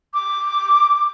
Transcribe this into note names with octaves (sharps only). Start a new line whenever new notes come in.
D6